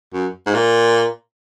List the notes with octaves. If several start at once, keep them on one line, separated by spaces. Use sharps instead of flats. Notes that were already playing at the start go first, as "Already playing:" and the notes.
F#2
G#2
A#2